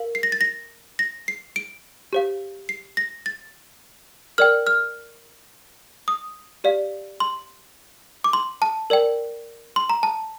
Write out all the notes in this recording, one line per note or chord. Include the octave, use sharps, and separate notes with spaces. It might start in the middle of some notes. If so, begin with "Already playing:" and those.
Already playing: A#4 F5
C7
A#6
A6
A#6
A#6
C7
D7
G4 C5 F5
C7
A#6
A6
A#4 D5 G5 F6
F6
D#6
G4 D5 F5
C6
D6
C6
A5
A#4 D5 G5
C6
A#5
A5